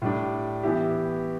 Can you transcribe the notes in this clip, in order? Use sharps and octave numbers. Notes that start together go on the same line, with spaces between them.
A2 G3 D4
E3 B3 E4 G4